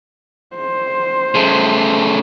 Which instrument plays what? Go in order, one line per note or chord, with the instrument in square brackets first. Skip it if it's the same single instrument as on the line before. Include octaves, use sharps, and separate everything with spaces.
[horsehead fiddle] C5
[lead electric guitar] C#3 A3